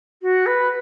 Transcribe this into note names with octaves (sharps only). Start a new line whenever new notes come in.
F#4
B4